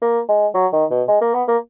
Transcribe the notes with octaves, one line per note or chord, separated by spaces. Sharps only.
A#3
G#3
F#3
D#3
B2
G#3
A#3
B3
A#3